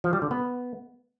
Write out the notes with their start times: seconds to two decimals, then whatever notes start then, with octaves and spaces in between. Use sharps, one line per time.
0.04 F3
0.13 G3
0.22 D3
0.31 B3